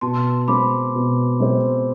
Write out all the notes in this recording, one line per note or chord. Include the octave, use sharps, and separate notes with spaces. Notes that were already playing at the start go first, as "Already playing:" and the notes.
B2 A5 C6
C6
G#3 C4 B5 D6
B2
G#3 C4